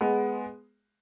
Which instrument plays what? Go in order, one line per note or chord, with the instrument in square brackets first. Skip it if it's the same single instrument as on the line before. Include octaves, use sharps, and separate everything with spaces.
[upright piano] G#3 B3